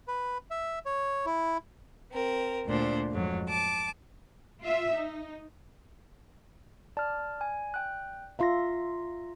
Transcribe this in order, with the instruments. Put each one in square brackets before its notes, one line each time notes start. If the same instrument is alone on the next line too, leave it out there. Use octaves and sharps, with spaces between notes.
[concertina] B4
E5
C#5
E4
[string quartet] C4 A#4
D2 A#2 D4 C5
F2 G#2 F#3
A5 D6
[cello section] F4 E5
D#4
[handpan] D5 [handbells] A5 F6
[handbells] G#5
G5 F#6
[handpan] F4 E5 F5 [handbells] A#5 C6 A#6